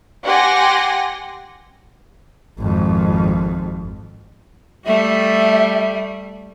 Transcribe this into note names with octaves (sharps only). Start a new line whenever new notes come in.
G4 F#5 G#5 C6 A#6
G#1 F2
G3 A3 E5